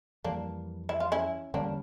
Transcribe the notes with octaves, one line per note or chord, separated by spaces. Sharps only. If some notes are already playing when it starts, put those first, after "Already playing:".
F2 E3 G3 A#3 D4
E4
F4
C#4 E4
E2 D3 G3 A#3 C#4 D4